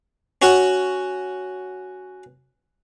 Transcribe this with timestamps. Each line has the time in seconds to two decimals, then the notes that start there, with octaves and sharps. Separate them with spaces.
0.42 C#4 F#4 F#5